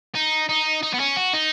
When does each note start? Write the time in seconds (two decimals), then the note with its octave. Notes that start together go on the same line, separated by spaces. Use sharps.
0.15 D#4
0.49 D#4
0.83 D#4
0.94 B3
1.00 C#4
1.17 F#4
1.34 D#4